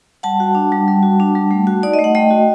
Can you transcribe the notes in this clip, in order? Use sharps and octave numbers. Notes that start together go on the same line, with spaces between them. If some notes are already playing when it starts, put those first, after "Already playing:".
G3 F#5 A5
F#4
D4
G3
G3
F#4
D4
G3
A3
F#4
D#4 D5
D#5
A3
F#5
A3 D#5 G5
F#4